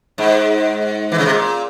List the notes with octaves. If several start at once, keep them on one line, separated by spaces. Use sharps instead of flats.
G#2
E3
C#3
C3
A#2